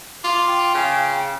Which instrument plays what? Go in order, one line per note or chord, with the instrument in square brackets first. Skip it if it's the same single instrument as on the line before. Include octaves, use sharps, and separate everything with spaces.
[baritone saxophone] F4 [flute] D6
[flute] G5
[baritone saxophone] C#3